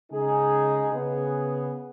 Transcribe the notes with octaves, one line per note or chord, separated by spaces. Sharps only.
C#3 G#3 D#4 G#4
C#3 B3 G#4